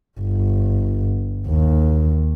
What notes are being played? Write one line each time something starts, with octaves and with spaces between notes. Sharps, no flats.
G1
D#2